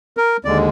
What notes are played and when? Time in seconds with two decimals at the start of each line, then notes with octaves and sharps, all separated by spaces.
0.17 A#4
0.45 D#2 D3 G#3 D5